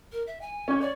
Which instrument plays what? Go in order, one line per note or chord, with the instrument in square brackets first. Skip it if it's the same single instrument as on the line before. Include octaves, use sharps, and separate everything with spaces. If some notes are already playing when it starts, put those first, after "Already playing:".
[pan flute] A#4
E5
G#5
[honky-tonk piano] C#4 C#5
[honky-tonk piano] C#5 [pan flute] D5